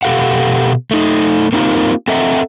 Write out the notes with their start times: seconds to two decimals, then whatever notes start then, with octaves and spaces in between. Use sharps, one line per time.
0.03 B2 G4 A4 F5 F#5
0.91 A3 D#4
1.53 A#3 C4 D#4 F4 G4 A#4
2.08 C4 A4 D#5 E5 F#5 A#5